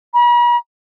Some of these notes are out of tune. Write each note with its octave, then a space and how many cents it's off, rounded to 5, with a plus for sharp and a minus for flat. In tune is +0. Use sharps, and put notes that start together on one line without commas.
B5 -45